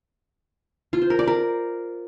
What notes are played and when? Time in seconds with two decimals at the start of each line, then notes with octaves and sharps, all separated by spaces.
0.93 F4
1.02 C5
1.10 A#4
1.19 D5
1.27 A#4